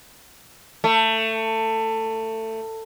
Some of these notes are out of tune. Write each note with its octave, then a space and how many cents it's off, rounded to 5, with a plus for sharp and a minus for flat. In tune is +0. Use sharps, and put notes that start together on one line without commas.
A3 +20